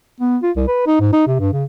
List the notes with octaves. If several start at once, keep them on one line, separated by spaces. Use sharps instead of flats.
B3
F4
C2
B4
D#4
G#2
D#4
C3
G2
C#3